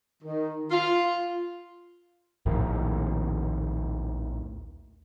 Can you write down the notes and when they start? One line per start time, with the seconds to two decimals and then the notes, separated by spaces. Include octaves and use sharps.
0.22 D#3
0.71 F4
2.46 A#1 D#2 A2 D#3